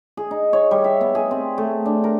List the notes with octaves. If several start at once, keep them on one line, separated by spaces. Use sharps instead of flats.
G#4
D#4
C#5
G3
E5
B3
G#4
C4
A3
D4
A#4